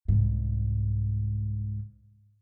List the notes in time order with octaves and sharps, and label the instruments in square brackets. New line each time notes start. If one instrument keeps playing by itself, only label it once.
[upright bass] C2 G#2